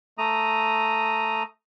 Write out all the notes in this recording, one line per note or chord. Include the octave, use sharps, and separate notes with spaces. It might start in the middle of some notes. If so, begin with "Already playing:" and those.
A3 A#5 D#6